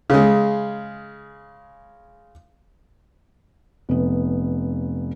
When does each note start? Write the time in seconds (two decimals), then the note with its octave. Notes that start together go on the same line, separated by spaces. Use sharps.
0.10 C#3 G#3
3.89 F1 B3